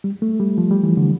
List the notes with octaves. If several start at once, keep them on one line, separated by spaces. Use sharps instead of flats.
G3
A3
G3
F3
G3
E3
D3